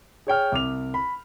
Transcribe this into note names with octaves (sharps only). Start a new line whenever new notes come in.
G#4 C#5 G5 F6
C2 D6 F7
B5